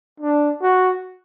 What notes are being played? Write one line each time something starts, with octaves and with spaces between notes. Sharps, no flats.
D4
F#4